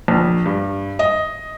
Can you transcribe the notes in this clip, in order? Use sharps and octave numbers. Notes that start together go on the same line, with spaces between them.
A#1
G2
D#5